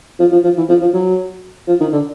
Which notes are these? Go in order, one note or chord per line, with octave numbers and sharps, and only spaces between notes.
F3
F3
F3
E3
F3
F3
F#3
F3
D#3
D3